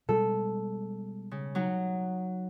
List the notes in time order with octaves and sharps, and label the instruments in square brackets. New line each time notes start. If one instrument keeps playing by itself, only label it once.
[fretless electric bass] B2 G3 G#3 [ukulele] A4
[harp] C#3
F#3 D#4 F#4